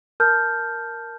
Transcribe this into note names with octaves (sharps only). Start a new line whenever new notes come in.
A#4 A5 F6 G6